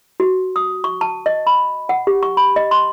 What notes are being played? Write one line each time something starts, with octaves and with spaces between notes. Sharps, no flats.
F#4
D#6
C#6
A5
D#5
B5
F#5
G4
C#6
B5
D#5
C6